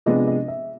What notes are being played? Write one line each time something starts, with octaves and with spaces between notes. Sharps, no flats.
C3 F3 G#3 B3 D4 D#5
D#5
E5